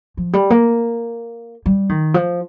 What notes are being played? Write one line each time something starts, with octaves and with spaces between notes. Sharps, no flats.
F3
G3
A#3
G3
D#3
F3